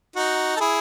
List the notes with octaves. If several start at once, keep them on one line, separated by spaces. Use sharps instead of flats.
D#4 F#4
A4
E4 G#4